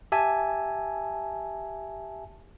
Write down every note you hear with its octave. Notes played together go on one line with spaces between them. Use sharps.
G4 E5 G#5 A5